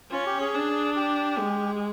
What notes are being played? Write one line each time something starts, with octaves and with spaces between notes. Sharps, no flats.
C#4 F4
G4
G#4
D4
G4
G#3